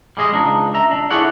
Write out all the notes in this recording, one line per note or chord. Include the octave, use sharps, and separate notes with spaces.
G3 G#3 G#4 D#5
C#2 D4 D#4
E5 A#5
D4
E4 G#4 A4 C#5 D5 F#5